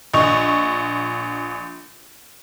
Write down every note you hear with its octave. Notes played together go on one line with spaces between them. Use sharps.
A#1 D#5 C#6 F7